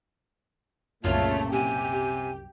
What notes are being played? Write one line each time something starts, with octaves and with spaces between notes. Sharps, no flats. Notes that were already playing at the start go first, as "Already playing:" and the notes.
C2 F#2 A#2 C#3 A3 F4 C#5
C3 G4 G#5